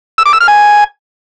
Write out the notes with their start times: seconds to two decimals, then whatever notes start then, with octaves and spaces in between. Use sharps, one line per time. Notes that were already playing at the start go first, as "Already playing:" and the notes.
0.18 E6
0.26 D6
0.33 E6
0.40 F6
0.48 G#5